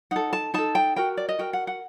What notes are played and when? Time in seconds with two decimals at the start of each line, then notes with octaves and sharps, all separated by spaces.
0.11 D#4 A4 F#5
0.33 A5
0.54 D#4 A4 A5
0.75 G5
0.96 F#4 A#4 G5
1.17 D5
1.29 D#5
1.39 F#4 A#4 G5
1.53 F#5
1.67 F#5